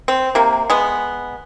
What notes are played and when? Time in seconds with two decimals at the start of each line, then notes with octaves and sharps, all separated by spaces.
0.08 C4
0.35 C3 A#3
0.70 G#3 B3